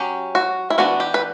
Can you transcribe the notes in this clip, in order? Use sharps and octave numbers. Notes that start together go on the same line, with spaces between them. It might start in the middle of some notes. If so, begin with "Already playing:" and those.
Already playing: F#3 C#4 G4
F#4
E4
E3 B3 D4 F#4
G4
B4